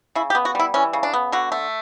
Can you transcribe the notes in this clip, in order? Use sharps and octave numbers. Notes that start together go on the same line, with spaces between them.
C#3 E4
G4
B3
F#4
G3 E4
E3 C#4
C#3
D4
B3
D3 F#4
A3